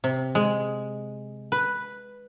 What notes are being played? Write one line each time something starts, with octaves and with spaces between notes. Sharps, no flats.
C3
G#3
B4